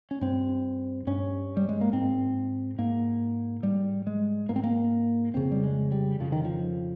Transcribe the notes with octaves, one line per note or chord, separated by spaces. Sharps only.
C#4
G2 C4
G2 C#4
G3
G#3
A#3
G#2 C4
G#2 A#3
G#2 G3
G#3
G#2 A#3
C4
A#3
F2 C#3 C4
G3
G#3
G3
F2 C#3 F3
D#3
F3